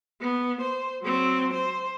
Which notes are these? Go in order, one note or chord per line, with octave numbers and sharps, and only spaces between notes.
B3
C5
F#3 C4
C5